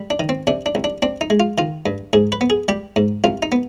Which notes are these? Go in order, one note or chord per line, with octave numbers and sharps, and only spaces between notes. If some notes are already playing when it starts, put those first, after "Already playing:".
Already playing: G3
D4
D#3
C4
C3 D4
D4
C2
D4
C4 D4
D#4
G#3
F4
D#3 F4
G2
G#2 G#4
B4
B3
G#4
G3 G4
G#2
C2 F4
D#4
B3